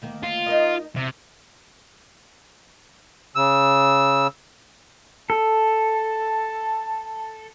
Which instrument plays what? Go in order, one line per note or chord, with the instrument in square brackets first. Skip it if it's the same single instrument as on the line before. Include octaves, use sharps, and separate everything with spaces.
[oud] D2 D#3 A#3
[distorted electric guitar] F4
[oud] D#4 A#4 D#5
[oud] E2 E5 [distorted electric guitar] C3
[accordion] C#3 E6
[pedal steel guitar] A4 [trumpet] A5